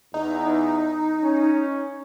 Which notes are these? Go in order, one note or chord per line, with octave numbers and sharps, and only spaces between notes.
E2 D#4
C#4